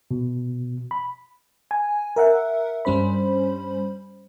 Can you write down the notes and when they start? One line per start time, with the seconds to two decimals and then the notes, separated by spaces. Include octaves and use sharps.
0.11 B2
0.91 B5
1.71 G#5
2.16 A#4 E5 F#5
2.85 G2 G3 C#4 C5 B5